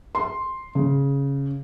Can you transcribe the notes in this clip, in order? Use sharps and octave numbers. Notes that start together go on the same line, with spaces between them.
C6
C#3